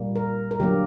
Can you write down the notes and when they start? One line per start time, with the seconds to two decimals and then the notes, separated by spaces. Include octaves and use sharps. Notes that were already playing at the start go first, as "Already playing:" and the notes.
Already playing: A#2 G3 A#3
0.16 A#4
0.51 A#4
0.60 D3 F#3 A#3 G4